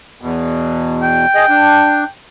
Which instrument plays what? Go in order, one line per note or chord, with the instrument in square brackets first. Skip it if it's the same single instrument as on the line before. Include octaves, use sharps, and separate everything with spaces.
[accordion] E2 B2
[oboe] G5
[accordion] G#4 D#5
D4